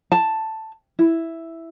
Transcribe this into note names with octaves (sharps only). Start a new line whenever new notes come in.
A5
E4